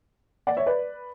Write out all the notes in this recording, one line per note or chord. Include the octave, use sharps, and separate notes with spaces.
D5 F#5
C#5 E5
B4 D5